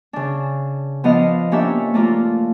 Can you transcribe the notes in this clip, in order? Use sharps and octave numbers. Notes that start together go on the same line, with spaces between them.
C#3 D4
F3 B3 D4 D#5 F5
A#3 C#4 D4 G4 C#5 E5
A3 A#3 D4 F4